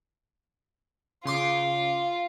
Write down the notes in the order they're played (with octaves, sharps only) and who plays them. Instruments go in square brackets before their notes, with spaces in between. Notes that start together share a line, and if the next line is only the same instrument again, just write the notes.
[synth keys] C#3 C6 D6 [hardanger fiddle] F4